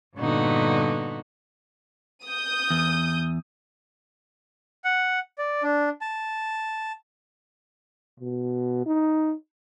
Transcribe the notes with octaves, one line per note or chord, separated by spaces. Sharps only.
G2 A#2 D3 B3 D#4 F#4
D#6 G6
E2
F#5
D5
D4
A5
B2
D#4